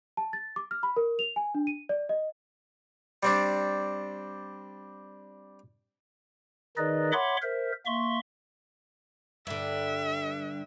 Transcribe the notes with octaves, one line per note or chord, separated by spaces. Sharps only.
A5
A6
D6
F6
B5
A#4
F7
G#5
D4
D#7
D5
D#5
G3 C4 D4
D#3 D#4 G#4 B4 D5 D#5
C#5 E5 F#5 B5 C6 D6
A#4 C5 E5
A#3 E5 C6 C#6
G2 D3 E5